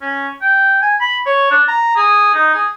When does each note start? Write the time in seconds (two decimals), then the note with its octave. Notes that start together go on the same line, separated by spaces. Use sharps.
0.01 C#4
0.41 G5
0.82 G#5
1.00 B5
1.26 C#5
1.51 D4
1.68 A#5
1.96 G#4
2.34 D#4
2.54 G#4